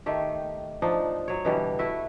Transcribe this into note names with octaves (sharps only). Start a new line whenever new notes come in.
D#3 A3 G4
F3 D4 D#4
F#3 C#5
B2 D3 E3 G3
A3 E4 F#4 E5